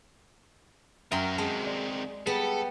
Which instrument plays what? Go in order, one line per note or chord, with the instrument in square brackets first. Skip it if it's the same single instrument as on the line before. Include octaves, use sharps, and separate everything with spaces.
[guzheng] F#2 C6 [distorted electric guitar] F#3 A#4 [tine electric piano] E5 G5
[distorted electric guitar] C3 D#3 [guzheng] G#3 [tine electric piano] A5
[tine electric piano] D5
[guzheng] G3 B3 [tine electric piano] G#4 [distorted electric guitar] A4